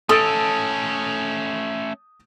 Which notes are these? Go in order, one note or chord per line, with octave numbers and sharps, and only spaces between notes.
A3 C#4 A4 D#6 A6 D7